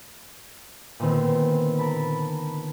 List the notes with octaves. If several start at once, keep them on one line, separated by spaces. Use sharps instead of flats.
A#2 D3 D#3 B3 C4
A#4 A5 B5